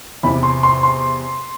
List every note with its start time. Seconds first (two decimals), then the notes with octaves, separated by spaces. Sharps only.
0.23 E2 C3 E3 B5
0.43 C6
0.63 C6
0.83 C6